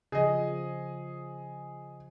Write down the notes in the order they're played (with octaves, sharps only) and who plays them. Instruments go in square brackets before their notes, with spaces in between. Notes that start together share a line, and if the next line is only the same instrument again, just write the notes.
[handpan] C#3 F3 [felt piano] G#4 D#5